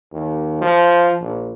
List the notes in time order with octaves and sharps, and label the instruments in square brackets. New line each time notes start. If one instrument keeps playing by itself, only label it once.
[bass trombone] D#2
F3
A#1